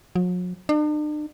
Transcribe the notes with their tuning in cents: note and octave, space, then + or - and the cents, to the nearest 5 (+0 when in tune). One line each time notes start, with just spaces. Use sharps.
F#3 -45
D4 +45